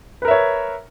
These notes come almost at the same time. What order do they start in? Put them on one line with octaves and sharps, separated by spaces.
B4 A#4 E5 C#5